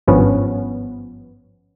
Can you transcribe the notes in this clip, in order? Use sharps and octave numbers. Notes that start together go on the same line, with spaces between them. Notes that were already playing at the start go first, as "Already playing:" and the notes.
G#1 G2 F3 B3 C#4